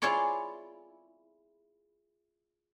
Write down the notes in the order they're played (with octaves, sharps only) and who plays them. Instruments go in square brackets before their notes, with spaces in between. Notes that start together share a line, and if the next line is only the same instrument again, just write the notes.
[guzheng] E4 F4 G#4 C#5 D5 C6